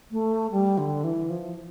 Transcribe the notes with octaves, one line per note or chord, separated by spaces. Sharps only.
A3
G3
D3
E3
F3